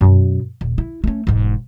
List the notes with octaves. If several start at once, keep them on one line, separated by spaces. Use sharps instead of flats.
F#2 B2
D#1
E4
A3 C#4
E1 G#2